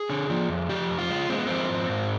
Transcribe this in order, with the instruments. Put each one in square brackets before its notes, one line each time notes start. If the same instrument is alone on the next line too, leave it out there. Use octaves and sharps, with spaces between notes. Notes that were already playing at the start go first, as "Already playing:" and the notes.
Already playing: [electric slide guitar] G#4
D3
F3
F2
F3 G4
F2
F4
G#3
G#3 C4
B3
F3 C4
G#2
G#2